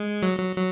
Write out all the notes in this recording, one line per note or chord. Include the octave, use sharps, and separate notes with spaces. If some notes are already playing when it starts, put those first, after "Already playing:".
Already playing: G#3
F#3
F#3
F#3